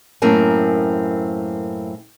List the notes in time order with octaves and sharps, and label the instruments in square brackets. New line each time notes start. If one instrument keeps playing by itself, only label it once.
[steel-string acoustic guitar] F#2 A2 A#3 C4 A#4 G#5